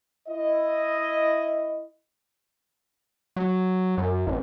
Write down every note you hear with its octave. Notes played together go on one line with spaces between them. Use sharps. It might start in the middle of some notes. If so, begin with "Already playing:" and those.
E4 D#5
F#3
F#2
A1